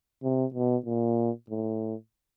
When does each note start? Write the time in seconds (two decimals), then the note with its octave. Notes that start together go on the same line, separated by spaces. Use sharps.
0.23 C3
0.54 B2
0.86 A#2
1.50 A2